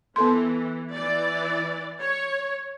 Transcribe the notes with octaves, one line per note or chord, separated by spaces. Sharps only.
E3 B3 A4 C6
E3 D5
C#5